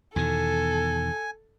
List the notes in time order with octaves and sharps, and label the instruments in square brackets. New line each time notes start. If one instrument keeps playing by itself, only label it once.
[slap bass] E2 B2 D#3 [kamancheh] A4 [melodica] G#5